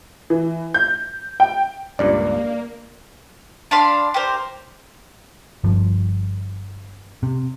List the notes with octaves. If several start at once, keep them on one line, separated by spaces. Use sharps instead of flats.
E3
G6
G5
C#2 G2 A#2 A#3 D5
D4 F5 B5 C6
G4 A#4 C5
G1 G2 F3
C3